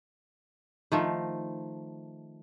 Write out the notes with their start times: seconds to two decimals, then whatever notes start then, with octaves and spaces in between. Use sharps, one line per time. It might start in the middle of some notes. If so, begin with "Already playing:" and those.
0.92 D#3 F3 A3